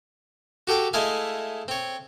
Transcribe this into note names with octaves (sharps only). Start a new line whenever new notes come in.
F#4 G4 A4 G5
G#3 A3 E4 D#5 F5 G#5
C4 C#5